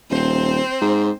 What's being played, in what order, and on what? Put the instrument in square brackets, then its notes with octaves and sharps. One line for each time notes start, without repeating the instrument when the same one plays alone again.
[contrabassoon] D#1 [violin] C4 C5
[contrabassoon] G#2